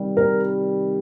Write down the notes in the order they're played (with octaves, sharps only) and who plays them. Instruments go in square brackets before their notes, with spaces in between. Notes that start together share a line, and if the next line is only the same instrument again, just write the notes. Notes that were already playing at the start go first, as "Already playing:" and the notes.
Already playing: [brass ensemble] C3 D#3 G3
[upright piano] A#4